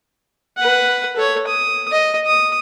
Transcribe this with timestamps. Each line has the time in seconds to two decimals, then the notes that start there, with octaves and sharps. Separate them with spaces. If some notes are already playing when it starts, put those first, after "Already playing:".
0.58 B4 F#5
1.16 A4 C#5
1.47 D#6
1.91 D#5
2.26 D#6